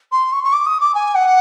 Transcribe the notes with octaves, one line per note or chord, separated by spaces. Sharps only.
C6
C#6
C#6
D6
D#6
D6
G#5
F#5